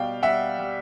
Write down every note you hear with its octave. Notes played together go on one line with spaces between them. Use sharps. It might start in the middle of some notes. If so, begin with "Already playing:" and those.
Already playing: B2 G3 F5 G5
G3 E5 F#5
G3